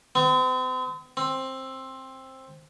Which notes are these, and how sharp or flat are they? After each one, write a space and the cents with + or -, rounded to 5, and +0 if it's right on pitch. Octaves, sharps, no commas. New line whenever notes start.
C4 -40
C4 +15